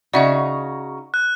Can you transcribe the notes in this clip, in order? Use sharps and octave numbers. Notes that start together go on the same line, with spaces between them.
C#3 D#4 F#4 D5 E5 F#5
F#6